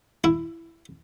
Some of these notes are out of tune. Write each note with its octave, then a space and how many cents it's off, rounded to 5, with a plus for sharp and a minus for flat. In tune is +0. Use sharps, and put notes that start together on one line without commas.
E4 +10